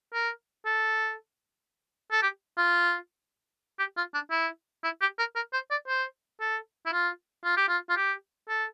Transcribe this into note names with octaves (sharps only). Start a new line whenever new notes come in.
A#4
A4
A4
G4
F4
G4
F4
D4
E4
E4
G4
A#4
A#4
C5
D5
C5
A4
E4
F4
F4
G4
F4
F4
G4
A4